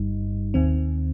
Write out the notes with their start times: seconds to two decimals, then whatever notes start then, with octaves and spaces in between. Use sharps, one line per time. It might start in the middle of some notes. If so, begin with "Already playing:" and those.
Already playing: G1 G2 G3 D#4
0.54 D#2 D#3 C4